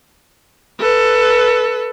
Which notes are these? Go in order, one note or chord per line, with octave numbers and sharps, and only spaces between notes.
A4 B4